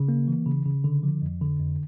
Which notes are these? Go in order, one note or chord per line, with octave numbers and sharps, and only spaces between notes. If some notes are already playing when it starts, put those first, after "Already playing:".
Already playing: C#3
A#3
E3
C#3
C#3
D3
F3
F2
D3
F2